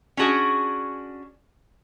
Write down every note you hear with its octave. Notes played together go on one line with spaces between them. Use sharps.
C#4 D4 F#4 G#4 D5